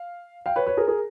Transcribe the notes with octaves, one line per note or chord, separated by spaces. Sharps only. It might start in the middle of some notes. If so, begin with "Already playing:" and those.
Already playing: F5
F5 G5
B4 C#5
B4 C#5
G#4 A#4
G#4 A#4